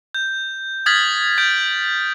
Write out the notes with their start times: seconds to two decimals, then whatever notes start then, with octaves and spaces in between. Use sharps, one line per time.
0.14 G6
0.86 D#6 F6 G#6 A6 B6 F#7
1.38 G6 G#6 D7